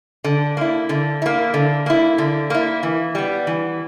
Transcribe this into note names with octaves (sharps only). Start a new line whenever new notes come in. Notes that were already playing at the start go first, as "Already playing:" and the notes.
D3
A#3 E4
D3
A#3 E4
D3
A#3 E4
D3
A#3 E4
E3
G3 B3
E3